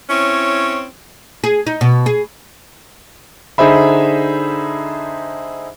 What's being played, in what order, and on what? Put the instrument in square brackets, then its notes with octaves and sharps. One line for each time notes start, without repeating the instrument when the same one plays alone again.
[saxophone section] C4 C#4 E4 C#5
[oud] G#4
D#4
B2
G#4
[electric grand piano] D3 D#4 G#4 C5 E5 B5